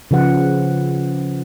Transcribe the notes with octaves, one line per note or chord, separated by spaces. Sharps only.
C#3 F3 B4 F#5